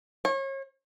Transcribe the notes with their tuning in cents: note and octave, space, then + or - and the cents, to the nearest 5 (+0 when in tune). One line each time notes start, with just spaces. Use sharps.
C#5 -35